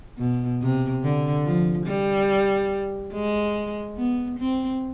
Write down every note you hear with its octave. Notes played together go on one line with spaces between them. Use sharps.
B2
C3
D3
F3
G3
G#3
B3
C4